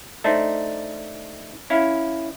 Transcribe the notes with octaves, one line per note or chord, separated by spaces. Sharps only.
A3 D4 D#4 C5
C#4 E4 F5